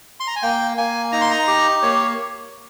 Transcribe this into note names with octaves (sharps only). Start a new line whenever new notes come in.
C6
A#5
G#5
A#3 G5
A#3 G#5
D#4 A#5
C6
A#5
G4
A#3 C#5